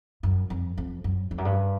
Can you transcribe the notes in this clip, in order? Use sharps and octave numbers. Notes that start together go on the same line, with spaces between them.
F#2
F2
F2
F#2
F2
F#2
G2